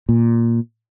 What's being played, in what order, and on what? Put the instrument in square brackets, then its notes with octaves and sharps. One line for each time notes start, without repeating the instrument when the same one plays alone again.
[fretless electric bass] A#2